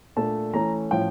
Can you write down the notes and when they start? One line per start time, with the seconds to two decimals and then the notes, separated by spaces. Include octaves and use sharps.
0.16 A#2 A3 D4 A5
0.54 E3 A3 C#4 A#5
0.91 A2 F3 C#4 G5